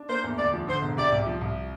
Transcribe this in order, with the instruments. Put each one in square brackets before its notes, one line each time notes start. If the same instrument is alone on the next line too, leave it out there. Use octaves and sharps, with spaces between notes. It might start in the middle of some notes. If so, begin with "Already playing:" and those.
Already playing: [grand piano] D4
[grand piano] A#3 [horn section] C5
[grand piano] E2
[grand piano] D2 [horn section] D5
[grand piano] F3
[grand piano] D3 [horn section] C5
[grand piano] E1
[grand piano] C3 [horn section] D5
[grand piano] C2
F3
C2